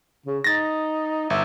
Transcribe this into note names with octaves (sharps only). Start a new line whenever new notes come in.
C#3
D#4 A6 A#6
G1 E5